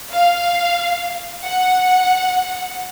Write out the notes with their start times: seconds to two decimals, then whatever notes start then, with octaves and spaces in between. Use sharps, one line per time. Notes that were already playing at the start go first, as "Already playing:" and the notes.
0.11 F5
1.45 F#5